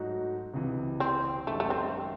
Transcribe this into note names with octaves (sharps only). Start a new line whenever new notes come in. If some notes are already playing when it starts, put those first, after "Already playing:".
Already playing: G#2 F#3 A3 D#4 F#4
C#2 C3 E3
C4
F#2 D#3 G#3 A3 D#4
A3
C4